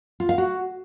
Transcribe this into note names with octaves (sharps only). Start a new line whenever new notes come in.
F4
F5
F#4